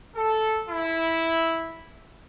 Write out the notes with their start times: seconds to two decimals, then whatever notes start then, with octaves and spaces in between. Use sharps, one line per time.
0.16 A4
0.69 E4